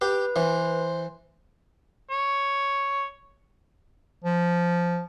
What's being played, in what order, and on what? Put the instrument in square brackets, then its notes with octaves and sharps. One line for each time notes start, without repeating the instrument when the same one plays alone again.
[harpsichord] G4 [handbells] B4
[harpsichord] E3 [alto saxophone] C5
[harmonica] C#5
[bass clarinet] F3